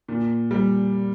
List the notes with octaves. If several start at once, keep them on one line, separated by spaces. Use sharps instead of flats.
A#2
G3